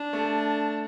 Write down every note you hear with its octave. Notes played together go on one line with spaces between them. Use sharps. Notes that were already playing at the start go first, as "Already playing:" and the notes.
Already playing: D4
A3